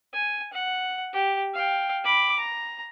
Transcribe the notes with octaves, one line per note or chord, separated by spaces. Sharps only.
G#5
F#5
G4
F5 G5
B5 D6
A#5